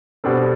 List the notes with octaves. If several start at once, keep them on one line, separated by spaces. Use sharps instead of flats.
B2 G3 D4 A4 C5